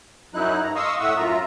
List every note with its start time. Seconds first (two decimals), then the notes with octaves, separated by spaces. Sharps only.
0.34 F#2 F#3 D#4 E4 F#6
0.63 G2 A#5
0.76 D#5 F5 C6 C#6 D#6 E6
1.00 A2 E5 F#5 C#6 D#6 E6
1.16 F#2 F4 E5 A#5